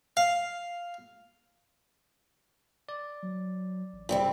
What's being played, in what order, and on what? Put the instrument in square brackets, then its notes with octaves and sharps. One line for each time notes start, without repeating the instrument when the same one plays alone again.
[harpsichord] F5
[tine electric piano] D5
[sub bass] F#3
A1
[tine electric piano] G2 C#3 [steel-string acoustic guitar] E3 G3 C4